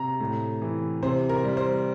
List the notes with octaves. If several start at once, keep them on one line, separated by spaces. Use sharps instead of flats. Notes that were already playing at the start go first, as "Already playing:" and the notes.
Already playing: C3 A#5
A2
E3
C3 C5
A#4
G3
C5